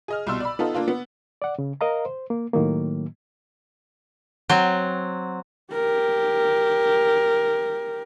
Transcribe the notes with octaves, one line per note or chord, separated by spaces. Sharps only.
G#4 D#5 F6
C2 B2 C6 E6
D5 B5
B3 D#4 F4 A4
A#3 D4 F4
B3
D5 F#5
C#3
A#4 D#5 F5 A#5
C5
A#3
A2 D#3 F#3 A#3
F#3 C4
G4 A#4